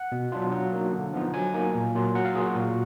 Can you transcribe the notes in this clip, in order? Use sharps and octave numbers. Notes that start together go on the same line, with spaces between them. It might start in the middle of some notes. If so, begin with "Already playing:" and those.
Already playing: F#5
B2
F#3 D4 F4
F#3
A#3 D#4
D3
F3 B3 D#4
F#3 G#5
A#3 D#4
A#2
F#3 A#3 F4
F#3 F#5
F5
A#3 F4 G#4
F#4
A#2